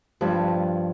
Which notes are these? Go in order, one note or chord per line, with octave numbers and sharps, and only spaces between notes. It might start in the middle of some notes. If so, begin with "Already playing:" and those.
G2 F3